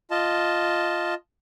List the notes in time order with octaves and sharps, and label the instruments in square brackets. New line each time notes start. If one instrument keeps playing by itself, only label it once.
[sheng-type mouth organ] F4 D#5 A5